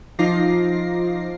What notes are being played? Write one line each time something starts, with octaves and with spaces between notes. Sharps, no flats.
F3 D#4 F4 D6 A#6 C7